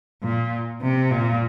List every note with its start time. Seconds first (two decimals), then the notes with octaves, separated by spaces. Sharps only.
0.23 A#2
0.82 C3
1.11 A#2